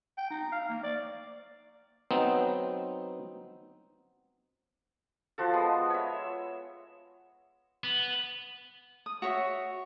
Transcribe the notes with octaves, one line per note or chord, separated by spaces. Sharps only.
G5
D#4
F5
A#3
D5
F#3 B3 C4 D#4
F3 F#4 A4
G#3 B3
C#5 E5
B3
D#6
F#4 C#5 E5